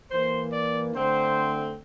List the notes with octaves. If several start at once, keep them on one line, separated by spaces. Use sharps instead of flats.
E3 A#3 C5
D5
D3 A3 C4 C5